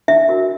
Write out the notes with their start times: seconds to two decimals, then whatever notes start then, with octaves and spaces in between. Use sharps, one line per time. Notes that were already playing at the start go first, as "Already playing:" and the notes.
0.08 D4 E5
0.29 F#4 A#4